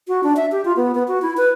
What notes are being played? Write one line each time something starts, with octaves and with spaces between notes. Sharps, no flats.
F#4
D4
E5
G4
F4
B3
B3
F#4
E4
B4